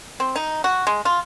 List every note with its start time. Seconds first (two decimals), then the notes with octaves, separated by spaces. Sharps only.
0.20 C4
0.36 D#4
0.64 F#4
0.87 G#3
1.05 F4